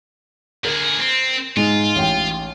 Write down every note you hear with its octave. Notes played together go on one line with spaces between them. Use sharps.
D3 G#4 A#4
C4
G#2 G#3 D#4 F4
A1 G5